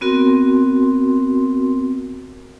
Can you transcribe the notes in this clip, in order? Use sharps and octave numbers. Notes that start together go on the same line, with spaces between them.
B3 C4 F#4 A#4 C6